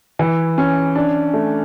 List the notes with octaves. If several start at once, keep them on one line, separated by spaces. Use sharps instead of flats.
E3
C#4
D4
A3